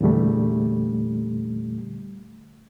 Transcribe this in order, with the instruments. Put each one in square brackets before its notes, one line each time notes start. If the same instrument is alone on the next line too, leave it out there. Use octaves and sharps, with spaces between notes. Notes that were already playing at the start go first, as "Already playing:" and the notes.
[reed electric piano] E2 A#2 D3 G3 A3